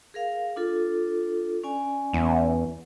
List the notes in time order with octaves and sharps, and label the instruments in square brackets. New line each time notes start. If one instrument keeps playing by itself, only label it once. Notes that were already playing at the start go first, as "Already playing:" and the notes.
[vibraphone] G#4 A#4 F5
D4 F4 A4
C#4 D5 G#5
[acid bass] E2